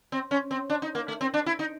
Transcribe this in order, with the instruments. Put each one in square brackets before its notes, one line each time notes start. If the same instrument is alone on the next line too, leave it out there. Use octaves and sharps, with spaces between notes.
[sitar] C4
C#4
C4
D4
D#4
A#3
A3
C4
D4
E4
D#4